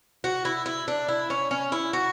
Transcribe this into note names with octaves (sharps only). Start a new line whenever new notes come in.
F#4
E4
E4
D4
E4
C#4
C#4
E4
F#4